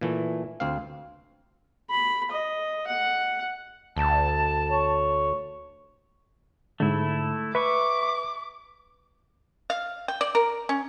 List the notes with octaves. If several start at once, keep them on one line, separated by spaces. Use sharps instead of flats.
A#2 E3 A3
D2 C4 F5
B5
D#5
F#5
D2 A5
C#5
G#2 D3 A3 E4
B4 E5 C#6 D6
F5
G5
D5
A#4
C#4